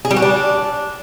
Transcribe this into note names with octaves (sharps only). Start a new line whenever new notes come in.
G#4
G3
F#4
D4